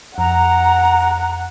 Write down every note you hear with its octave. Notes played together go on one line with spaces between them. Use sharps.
F2 F#5 A#5